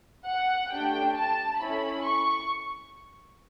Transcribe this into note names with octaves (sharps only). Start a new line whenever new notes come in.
F#5
A3 D4 G4 G5
A5
C#4 E4 A4 B5
C#6